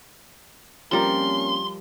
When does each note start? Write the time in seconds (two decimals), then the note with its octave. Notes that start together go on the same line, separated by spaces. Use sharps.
0.92 F3 G3 A#3 C4 C#4 A#4 C6